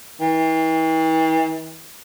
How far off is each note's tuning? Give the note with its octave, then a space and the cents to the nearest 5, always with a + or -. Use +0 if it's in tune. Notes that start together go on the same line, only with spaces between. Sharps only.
E3 -40